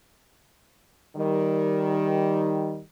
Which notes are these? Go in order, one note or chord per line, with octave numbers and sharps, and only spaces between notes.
D#3 G3